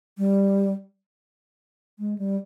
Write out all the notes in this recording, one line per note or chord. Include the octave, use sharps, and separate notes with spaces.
G3
G#3
G3